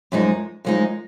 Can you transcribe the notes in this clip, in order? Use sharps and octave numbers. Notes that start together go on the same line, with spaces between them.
F#2 F3 G#3 D#4
F#2 F3 G#3 D#4